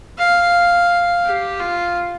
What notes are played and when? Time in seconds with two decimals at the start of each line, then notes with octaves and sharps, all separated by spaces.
0.19 F5
1.25 G4
1.60 F4